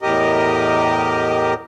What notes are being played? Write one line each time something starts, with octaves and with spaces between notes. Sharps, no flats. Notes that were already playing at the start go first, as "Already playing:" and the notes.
E2 A2 G4 A#4 D#5